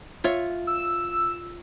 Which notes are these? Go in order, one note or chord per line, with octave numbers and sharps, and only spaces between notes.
F4 C#5 E5
E6